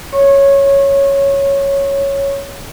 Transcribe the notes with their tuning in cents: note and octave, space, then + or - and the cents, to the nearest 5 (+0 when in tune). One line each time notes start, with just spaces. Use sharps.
C#5 +0 C#6 -30